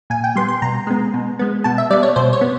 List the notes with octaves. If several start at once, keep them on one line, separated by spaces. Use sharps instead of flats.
A#2 G#5
G5
G3 B3 C6
C6
B2 A#5
G#3 B3
B2
G#3 B3
B2 A5
E5
G3 B3 D5
C#5
B2 C5
C#5
B3